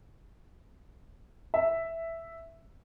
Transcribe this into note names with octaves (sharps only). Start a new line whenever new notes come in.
E5